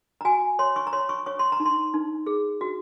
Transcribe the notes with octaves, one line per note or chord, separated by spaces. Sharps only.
A#5
F#4 G#5
C#5 C6
C#6
A#5
C#5 C6
C#6
C#5 C#6
C6
A#5
D#4
C6
D#4
G#4
F#4